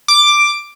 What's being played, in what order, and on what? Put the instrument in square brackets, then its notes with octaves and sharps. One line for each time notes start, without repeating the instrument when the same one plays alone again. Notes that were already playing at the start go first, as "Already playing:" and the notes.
[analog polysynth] D6